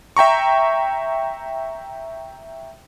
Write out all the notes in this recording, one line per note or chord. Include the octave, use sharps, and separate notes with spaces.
E5 G5 A#5 C#6